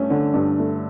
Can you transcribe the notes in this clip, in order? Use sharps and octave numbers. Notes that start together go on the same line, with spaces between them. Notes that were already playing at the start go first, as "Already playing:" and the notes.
Already playing: G2 A3 C#4
D3
G2
A3